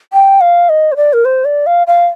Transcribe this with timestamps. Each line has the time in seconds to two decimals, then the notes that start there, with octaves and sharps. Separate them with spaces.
0.13 G5
0.41 F5
0.69 D#5
0.92 C5
0.96 D5
1.13 A#4
1.25 C5
1.45 D5
1.66 F5
1.87 F5